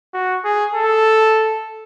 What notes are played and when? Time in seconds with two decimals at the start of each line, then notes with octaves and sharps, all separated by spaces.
0.14 F#4
0.44 G#4
0.74 A4